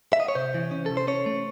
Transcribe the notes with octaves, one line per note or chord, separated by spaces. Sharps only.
E5
D#5
C#5
C3 C5
E3
C#4
C3 A4
C5
C#4 C#5
A3